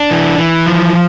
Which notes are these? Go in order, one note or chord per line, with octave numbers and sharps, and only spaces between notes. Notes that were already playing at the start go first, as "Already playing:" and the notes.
Already playing: D4
E3
E3
F3